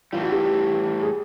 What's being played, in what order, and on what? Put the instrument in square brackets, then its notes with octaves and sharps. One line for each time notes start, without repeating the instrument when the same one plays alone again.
[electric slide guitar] A2 E3 G3 [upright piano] F4
[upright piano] F#4
G4
G#4